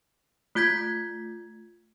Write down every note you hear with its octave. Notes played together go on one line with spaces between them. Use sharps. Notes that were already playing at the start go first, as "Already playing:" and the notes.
A3 F4 G6 G#6 B6